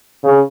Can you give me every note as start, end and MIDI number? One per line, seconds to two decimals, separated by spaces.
0.24 0.40 49